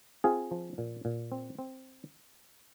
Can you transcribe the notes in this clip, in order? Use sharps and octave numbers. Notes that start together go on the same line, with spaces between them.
C4 F4 G#4
F3
A#2
A#2
C4
C4